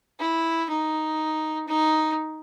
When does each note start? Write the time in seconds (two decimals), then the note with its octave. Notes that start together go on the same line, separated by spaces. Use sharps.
0.19 E4
0.69 D#4
1.68 D#4